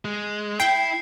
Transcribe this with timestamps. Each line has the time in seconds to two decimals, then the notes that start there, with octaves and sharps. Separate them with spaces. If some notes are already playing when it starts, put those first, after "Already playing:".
0.05 G#3
0.60 E4 G5 C7